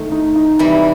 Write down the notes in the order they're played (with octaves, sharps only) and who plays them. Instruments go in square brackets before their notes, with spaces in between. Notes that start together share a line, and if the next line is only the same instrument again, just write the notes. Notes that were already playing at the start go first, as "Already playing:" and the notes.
Already playing: [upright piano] D#3 A3
D#4
D#4
[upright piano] C3 [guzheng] E3 G3